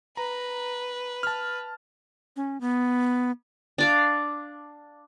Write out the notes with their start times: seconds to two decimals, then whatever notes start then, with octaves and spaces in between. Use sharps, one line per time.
0.17 B4 A#5
1.23 A5 F6
2.36 C#4
2.61 B3
3.78 D4 D5 F5